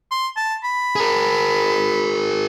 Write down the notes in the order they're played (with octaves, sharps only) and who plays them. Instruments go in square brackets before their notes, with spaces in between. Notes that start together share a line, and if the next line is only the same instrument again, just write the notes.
[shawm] C6
A5
B5
[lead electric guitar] G#4 A#4